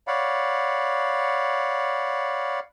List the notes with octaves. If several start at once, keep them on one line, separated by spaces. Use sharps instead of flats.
C#5 D5 F5 F#5 B5